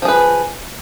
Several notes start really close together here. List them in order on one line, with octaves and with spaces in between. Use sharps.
F3 G#4 B4